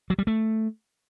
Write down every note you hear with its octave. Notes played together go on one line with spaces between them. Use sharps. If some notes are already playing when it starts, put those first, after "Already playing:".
F#3
G3
A3